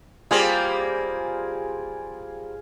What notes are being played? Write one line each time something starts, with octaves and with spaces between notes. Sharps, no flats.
G3 A#3 C4 F4 G#4